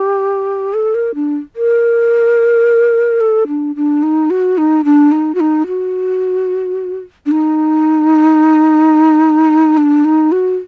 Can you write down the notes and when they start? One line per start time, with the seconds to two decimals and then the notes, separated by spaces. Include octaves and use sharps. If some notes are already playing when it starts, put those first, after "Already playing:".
Already playing: G4
0.74 A4
0.94 A#4
1.15 D4
1.56 A#4
3.20 A4
3.47 D4
3.76 D4
4.03 D#4
4.30 F#4
4.58 D#4
4.84 D4
5.12 D#4
5.35 F#4
5.40 D#4
5.67 F#4
7.26 D4
7.31 D#4
9.77 D4
10.05 D#4
10.32 F#4